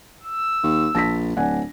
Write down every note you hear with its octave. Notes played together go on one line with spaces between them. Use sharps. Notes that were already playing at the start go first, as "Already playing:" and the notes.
E6
D#2
A#1 A5 A#6 B6
D1 D4 F#5 G#5